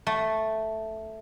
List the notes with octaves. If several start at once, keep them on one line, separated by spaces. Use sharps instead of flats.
A3